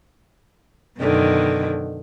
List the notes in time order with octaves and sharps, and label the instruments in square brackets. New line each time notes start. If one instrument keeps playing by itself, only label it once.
[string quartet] F#2 B2 D3 D#3